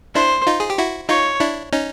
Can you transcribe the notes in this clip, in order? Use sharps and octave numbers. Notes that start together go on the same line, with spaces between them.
D4 E4 C5
D#4 F4
G#4
G4
E4 F#4
D#4 F4 C#5
D4 E4
C#4 D#4